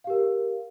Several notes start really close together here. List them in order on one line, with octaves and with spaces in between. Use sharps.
F5 G4 A#4